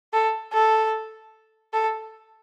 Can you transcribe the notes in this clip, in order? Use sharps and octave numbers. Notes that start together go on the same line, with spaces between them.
A4
A4
A4